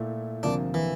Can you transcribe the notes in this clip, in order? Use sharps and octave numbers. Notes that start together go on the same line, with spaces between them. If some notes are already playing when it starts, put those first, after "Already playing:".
Already playing: A#2 A3 E4
D2 C3 F3 A#3 D4
E3